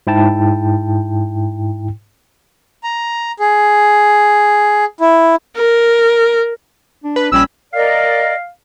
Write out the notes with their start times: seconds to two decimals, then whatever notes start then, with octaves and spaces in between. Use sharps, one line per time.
0.07 G#2 E4 G5 A5
2.83 A#5
3.40 G#4
5.01 E4
5.56 A#4
7.04 D4
7.16 B4
7.32 A#1 G3 C#4 B5 E6
7.73 A#4 D5 D#5 F5